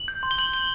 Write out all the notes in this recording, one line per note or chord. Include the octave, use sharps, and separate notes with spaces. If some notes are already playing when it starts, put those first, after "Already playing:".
Already playing: F#7
G6
C6
G7
G6 F#7
G6 G7